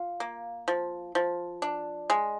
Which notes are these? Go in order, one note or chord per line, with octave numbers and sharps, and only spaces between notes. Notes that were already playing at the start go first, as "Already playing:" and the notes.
Already playing: F4
A#3
F3
F3
D4
G#3